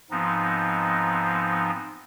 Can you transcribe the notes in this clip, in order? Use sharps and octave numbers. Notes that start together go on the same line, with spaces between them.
G#2 F3 B3 C4 D#4